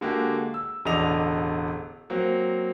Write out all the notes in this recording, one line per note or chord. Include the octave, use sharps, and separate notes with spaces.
D3 G#3 A#3 F#4 G4
E6
E1 A1 D3 D5 D#5 F7
F#3 A#3 C4